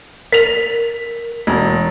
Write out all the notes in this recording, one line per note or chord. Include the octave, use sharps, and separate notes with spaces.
A#4 B6 F7
E1